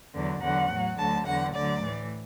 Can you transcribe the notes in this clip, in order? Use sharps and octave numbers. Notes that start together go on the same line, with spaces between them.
E2 D3 F#3
E2 D3 F#3 F#5
A2 F#3
D2 D3 F#3 A5
E2 D3 F#3 F#5
D2 D3 F#3 D5
A2 E3